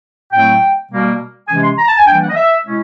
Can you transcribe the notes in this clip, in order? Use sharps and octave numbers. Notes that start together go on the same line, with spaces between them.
A2 F#3 A3 C4 G5
B2 G3 A#3
C3 E3 G#3 C#4 G#5
C6
A#5
A5
G#5
E3 G3 A#3 D4 G5
F#5
D#5
E5
B2 G#3 C#4 E4